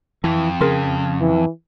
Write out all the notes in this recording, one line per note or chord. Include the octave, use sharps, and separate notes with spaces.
F2 E3
C#3 G#4 A#4 C6
E3